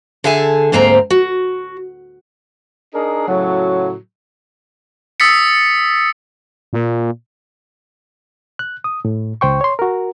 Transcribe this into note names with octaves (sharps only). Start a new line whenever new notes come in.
D3 G#4 E5 G#5 A5
D2 G#2 A#3 C4 A5 A#5
F#4
D4 D#4 G#4 A#4
A2 C#3 F#3
D#6 E6 A6 B6 C#7
A#2
F#6
D#6
A2
C#2 C5 G5 C#6
C#5 C6
F#4 A#4